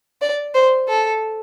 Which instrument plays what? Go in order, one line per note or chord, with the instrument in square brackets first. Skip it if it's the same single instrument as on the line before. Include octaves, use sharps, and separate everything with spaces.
[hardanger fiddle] D5
C5
A4